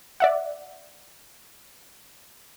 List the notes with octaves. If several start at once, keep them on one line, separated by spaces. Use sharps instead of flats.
D5 E5 F#5